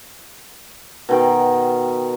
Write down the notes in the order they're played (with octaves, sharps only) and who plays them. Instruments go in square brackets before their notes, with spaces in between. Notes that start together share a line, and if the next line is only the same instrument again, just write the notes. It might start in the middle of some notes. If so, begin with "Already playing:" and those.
[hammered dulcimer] B2 D#3 G5